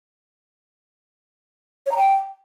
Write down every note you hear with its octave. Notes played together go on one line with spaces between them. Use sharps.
C#5
A#5
G5